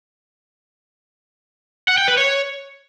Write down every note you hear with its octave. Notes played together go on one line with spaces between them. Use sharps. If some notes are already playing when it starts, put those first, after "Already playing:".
F#5
G5
B4
C#5